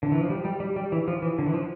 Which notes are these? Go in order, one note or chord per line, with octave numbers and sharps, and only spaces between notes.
D3
E3
F3
G3
G3
G3
G3
E3
F3
E3
D3
E3
F3